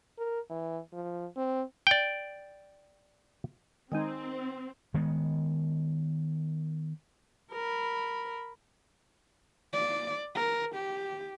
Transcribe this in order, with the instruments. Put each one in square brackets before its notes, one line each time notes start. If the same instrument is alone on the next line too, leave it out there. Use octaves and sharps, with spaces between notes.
[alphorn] A#4
E3
F3
C4
[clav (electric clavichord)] D5 G5
[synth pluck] D#3 G#3 D#4 [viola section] C4
[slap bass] D#3 G#3 B3
[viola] A#4 B5
[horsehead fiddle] D5
A#4
G4